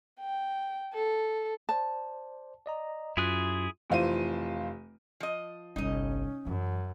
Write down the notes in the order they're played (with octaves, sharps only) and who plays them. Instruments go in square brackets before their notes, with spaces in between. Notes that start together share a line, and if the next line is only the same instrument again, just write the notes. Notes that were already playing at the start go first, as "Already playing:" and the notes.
[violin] G5
A4
[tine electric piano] C5 D5 [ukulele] A5
[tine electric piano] D5 D#5 A#5
[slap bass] F#2 [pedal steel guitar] E4 G#4 F#6 [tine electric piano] F4 C6
[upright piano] F1 E3 F4 C5 D#7
[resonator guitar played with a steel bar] F3 D#5
[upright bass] G1 C2 [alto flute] C#4 [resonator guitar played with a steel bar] D#4 D#5
[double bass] F#2 [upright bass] E3